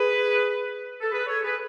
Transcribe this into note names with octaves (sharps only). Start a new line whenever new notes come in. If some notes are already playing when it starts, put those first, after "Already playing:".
Already playing: G#4 B4
A4
G#4 B4
A4 C#5
G#4 B4